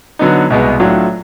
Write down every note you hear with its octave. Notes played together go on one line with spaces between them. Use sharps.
D3 F#3 B3 D#4
C2 B2 G#3 B3
A2 F#3 A3 D4 F4